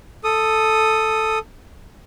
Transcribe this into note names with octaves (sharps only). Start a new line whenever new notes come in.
A4 D#6